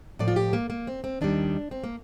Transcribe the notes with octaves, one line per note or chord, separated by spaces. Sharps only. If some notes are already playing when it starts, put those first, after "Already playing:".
A2 F3 D5
F4
G4
A#3
A#3
C4
C4
D#2 D#3 G3 D4
C4
A#3